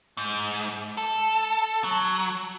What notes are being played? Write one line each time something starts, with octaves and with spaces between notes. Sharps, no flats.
G#2
A4
F#3